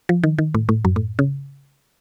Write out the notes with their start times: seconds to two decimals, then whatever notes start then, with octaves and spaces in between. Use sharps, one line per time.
0.09 F3
0.24 D#3
0.39 D#3
0.55 A2
0.69 A2
0.85 F#2
0.96 A2
1.19 C#3